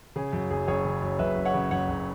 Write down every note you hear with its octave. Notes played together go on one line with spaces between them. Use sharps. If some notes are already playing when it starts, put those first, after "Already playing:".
C#3 G#4
F#2
F#1 G#4
F#1 G#4 C#5
C#3
F#2
F#1 B4 E5
F#1
C#5 F#5
C#3
F#2 C#5 F#5
F#1